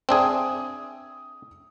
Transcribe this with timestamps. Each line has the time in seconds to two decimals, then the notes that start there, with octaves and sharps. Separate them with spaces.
0.09 C4 D4 G#4 E5 D#6